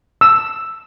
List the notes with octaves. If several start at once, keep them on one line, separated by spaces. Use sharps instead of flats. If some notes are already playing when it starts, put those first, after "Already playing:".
E6